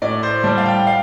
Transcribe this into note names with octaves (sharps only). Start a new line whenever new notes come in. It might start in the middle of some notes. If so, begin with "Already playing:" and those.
A2 D5
C5
G3 A5
F5
G5
F5